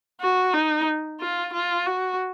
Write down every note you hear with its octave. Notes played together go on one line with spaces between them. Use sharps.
F#4
D#4
F4
F4
F#4